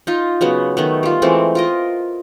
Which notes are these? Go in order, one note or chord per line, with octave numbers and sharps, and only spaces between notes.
D#4 F4
C#3 F#3 B3
D#3 A3 B3
G3 F4
E3 G#3 A3 C4
F4 A#4 D#5